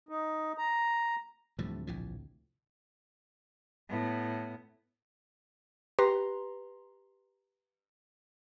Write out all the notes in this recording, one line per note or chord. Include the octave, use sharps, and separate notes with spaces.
D#4
A#5
D2 A2 C3 E3 F3 G3
A#1 E3 F3
A2 B3
G4 B4 A#5 C6